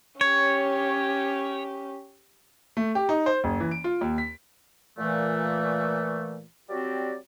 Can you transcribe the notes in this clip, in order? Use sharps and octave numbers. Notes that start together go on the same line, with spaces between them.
C#4 G4 C#5
A3
G4
D#4
C5
F#1
E3
D7
F4
D#2
B6
A#2 E3 A3
F#3 G3 C4 F#4 G4 D5